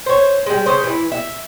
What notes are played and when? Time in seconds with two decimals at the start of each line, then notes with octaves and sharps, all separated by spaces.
0.06 C5 C#5
0.46 G3 G#3
0.66 C#3 C5
0.84 E3 E4
1.12 E5